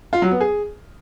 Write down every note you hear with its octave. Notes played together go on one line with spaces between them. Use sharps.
F4
F#3
B3
G#4